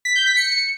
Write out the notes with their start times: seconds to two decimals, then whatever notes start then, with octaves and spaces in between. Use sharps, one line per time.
0.05 B6
0.15 G6
0.26 B6
0.36 C#7